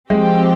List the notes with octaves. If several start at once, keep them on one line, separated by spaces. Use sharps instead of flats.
F3 G#3 C4 G4